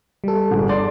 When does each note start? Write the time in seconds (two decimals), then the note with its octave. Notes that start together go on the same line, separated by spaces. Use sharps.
0.24 G3 A4
0.51 G1 G#4
0.69 D5 C6